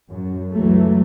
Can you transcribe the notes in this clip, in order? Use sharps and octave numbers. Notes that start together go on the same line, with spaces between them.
F#2
C#2 E3 F#3 A3